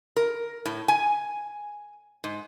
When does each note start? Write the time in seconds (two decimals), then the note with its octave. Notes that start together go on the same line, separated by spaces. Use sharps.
0.16 A#4
0.66 A2
0.88 G#5
2.24 G#2